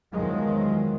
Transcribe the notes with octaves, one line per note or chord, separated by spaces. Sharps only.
E2 D#3 F3 F#3 G#3